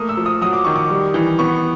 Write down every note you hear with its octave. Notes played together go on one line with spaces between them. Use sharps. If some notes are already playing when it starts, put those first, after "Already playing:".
Already playing: A3 A#3 D#6
E6
F3
D#6
F#3 D#6
D6
D#3 C#6
D6
G3
E3
B3 C#6